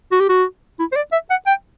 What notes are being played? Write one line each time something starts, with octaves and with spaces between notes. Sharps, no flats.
F#4
G4
F#4
E4
C5
D5
E5
F#5
G5